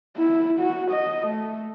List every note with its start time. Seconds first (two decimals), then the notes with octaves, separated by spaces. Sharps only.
0.17 E4
0.60 F#4
0.91 D#5
1.27 A3